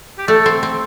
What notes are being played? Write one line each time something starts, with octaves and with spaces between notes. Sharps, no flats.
G4
A3 A4
C4
C4